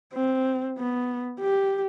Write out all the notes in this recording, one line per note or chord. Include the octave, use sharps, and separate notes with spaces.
C4
B3
G4